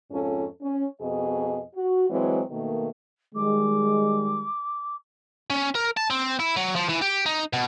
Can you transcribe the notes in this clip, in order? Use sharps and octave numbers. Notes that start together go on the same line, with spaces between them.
F2 G#2 C#4 F4 A4
C#4
F2 B2 G#4 D#5
F#4
E3 F#3 G#3 C4
B2 D#3 A3 A#3
D#3 G3 G#3 D6
C#4
A#4
A5
C4
E4
F#3
F3
E3
G4
D#4
B2